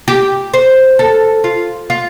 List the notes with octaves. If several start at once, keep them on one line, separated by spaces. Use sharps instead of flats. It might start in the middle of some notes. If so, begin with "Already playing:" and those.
G4
C5
A4
F4
F4